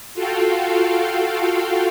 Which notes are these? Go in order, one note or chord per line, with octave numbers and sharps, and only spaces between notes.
F4 F#4 A4 F5 G5